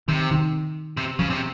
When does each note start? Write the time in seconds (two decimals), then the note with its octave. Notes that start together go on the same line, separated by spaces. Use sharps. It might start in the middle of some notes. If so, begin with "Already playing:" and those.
0.08 C3 D#3
0.31 D#3
0.97 C3
1.19 C#3 F3
1.30 C3